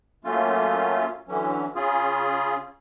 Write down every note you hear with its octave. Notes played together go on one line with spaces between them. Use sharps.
F#3 A3 A#3 C#4 F4
D3 E3 F#3 C#4
C#3 C#4 F4 G#4